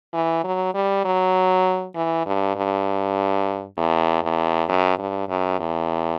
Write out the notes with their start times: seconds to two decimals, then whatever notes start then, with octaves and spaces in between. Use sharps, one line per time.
0.14 E3
0.44 F#3
0.74 G3
1.05 F#3
1.95 E3
2.26 G2
2.56 G2
3.78 E2
4.23 E2
4.69 F#2
4.99 G2
5.29 F#2
5.60 E2